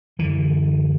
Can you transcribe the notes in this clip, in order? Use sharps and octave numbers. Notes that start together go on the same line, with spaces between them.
F#2 D3 E3